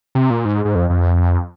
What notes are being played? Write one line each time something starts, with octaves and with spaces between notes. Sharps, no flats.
C3
A#2
G#2
G#2
F2
F2